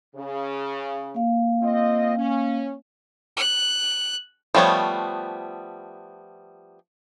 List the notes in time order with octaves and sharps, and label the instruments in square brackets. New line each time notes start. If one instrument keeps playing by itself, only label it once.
[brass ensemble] C#3
[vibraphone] A#3 F5
[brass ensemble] C4 F4 D#5
C#4
[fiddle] F#6
[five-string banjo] F3 G3 A3 B3 C#5